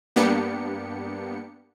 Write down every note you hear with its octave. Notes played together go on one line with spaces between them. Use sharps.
G2 A#3 B3 D4 G4 C#7